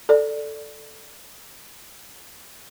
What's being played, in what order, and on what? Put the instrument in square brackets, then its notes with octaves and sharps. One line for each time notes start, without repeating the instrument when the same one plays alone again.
[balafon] A4 D5